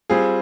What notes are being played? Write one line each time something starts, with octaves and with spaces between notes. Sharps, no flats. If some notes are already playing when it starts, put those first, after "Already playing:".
G3 C4 F4 G#4